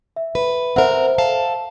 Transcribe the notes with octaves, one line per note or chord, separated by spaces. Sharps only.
E5
B4
C4 A#4 C5 E5 F#5
A4 F5 A5